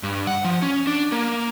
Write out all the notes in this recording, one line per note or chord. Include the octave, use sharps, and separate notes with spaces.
G2
F#5
F3
C#4
D4
A#3